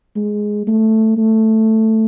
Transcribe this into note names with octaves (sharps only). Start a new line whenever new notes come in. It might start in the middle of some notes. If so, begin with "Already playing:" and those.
G#3
A3
A3